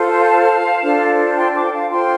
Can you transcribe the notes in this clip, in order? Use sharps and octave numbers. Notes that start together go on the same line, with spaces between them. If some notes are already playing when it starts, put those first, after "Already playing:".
Already playing: F4 A4 C5
F5 A5
F5 A5
D4 F4 A4 C5
G5 C6
A5 D6
G5
F5 A5
F4 A4 C5 G5 C6